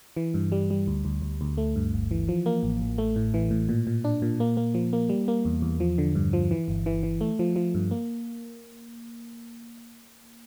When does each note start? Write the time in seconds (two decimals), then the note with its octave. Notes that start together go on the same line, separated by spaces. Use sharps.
0.17 E3
0.34 G2
0.52 G3
0.71 G3
0.87 D2
1.05 D2
1.22 D2
1.41 D2
1.58 A3
1.76 G2
1.93 G1
2.11 E3
2.29 F3
2.46 A#3
2.63 A1
2.82 A1
2.98 A3
3.16 A2
3.34 E3
3.51 A2
3.69 A#2
3.87 A#2
4.04 D4
4.22 A#2
4.40 A#3
4.57 A#3
4.74 F3
4.93 A#3
5.09 G3
5.28 A#3
5.45 E2
5.62 E2
5.80 F3
5.98 D3
6.15 G2
6.33 F3
6.51 E3
6.68 G1
6.86 E3
7.03 E3
7.21 A3
7.39 F3
7.56 F3
7.75 G2
7.91 A#3